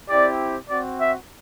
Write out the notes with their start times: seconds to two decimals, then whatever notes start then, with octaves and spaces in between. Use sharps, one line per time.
0.08 C4 E4 G4 D5
0.68 C4 F#4 D5
0.99 E5